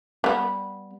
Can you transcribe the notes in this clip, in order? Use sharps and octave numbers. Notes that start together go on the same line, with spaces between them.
G3 B3